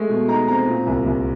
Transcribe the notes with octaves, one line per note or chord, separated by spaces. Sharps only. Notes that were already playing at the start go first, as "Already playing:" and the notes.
Already playing: G#3 A3
B2
D#4 A#5
C4 A#5
A#2
C2
C2